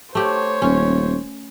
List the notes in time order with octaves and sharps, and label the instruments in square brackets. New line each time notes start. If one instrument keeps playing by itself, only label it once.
[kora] A3 G4 [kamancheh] C5 C#5
[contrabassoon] D#1 [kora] C#4